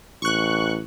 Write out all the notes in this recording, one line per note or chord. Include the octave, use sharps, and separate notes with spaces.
A1 C#6 F#6